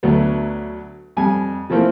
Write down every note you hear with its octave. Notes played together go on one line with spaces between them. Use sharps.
D2 F#3 A3 B3
F2 G3 G#5
E3 F3 A3 A#3 C4